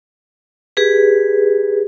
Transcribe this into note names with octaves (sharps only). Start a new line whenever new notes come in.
G4 G#4 B4